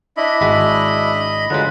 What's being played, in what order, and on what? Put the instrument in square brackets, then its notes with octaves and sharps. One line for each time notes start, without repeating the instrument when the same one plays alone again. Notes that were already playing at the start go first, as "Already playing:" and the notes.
[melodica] D4 E4 E5 [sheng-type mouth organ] D#5 B5
[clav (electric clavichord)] G#1 G#3 F#4
[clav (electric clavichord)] D3 G#3 [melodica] F#3 F4 B4